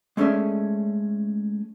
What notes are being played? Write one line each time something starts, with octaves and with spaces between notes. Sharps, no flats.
G#3 A3 C#4 G#4 D5 E5